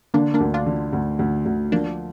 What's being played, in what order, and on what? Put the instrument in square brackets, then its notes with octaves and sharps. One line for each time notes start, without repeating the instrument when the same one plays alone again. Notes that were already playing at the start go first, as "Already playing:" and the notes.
[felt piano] D3 [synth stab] A#3 D4
[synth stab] A#3 D4
[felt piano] D2
[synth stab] D4 F4
[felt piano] D3
D2
D2
D2
[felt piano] F3 [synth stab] A#3 D4